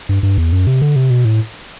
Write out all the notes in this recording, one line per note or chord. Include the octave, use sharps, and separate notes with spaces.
G2
G2
E2
F#2
C3
D3
C3
B2
A2